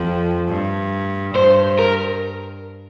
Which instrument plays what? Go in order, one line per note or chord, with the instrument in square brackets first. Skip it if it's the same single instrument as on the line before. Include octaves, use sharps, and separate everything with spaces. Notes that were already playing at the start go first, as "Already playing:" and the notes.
Already playing: [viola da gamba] F2
G2
[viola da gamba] G2 [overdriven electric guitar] C5
[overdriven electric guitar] A#4